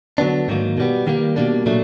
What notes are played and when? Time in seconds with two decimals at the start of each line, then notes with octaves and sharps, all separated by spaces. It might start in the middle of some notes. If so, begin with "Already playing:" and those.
0.18 D3 F#3 B3 D4
0.48 G#2 D#3 F#3 A#3
0.77 B2 G3 B3
1.07 D#3 G3 A#3
1.36 B2 G3 A#3 D4
1.66 A#2 F#3 A3 D4